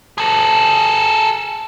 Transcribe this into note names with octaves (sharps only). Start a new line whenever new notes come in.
G#4 A4